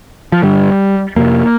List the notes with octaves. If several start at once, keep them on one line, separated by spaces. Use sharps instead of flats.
F3
G2 D3 G3
F2 C3 A#3